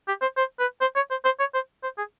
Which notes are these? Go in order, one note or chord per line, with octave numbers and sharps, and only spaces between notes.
G4
C5
C5
B4
C5
C#5
C5
C5
C#5
C5
C5
G#4